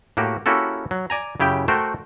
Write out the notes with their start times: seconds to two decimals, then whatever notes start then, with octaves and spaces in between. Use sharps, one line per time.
0.17 A2 A#3 F#4 G4
0.46 A#3 C#4 E4 F#4 G4 A4
0.91 F#3
1.10 D5 G#5 A#5
1.40 F#2 C#3 E4 G4 G5
1.68 A3 F#4 A#4 C5 G5